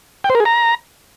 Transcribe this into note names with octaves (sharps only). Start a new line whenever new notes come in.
G5
C5
A#4
G#4
A#5